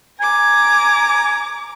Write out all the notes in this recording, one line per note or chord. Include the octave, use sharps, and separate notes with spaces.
G#5 A#5 D6